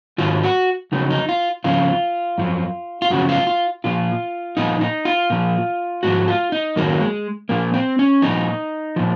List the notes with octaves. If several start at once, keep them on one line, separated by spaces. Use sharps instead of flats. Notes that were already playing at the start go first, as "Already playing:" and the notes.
G#2 D#3 F#3 F4
F#4
F2 C#3 F#3 D#4
D#4
F4
F2 C#3 F3 F4
F#2 F3
F4
F#2 C#3 F3 F#4
F4
F4
A#2 F3 F4
A#2 F3 D#4
D#4
F4
A#2 F3
G#2 F3 F#4
F4
D#4
F#2 D#3 F#3 A#3
G#3
A#2 F3 A#3
C4
C#4
A#2 F3 D#4
A#2 F3